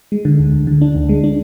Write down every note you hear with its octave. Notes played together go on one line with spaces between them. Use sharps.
G#3
D3
D2
D2
D3
D4
D2
G#3
D4